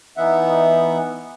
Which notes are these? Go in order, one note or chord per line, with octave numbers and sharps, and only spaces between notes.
E3 B3 D#4 E5 F#5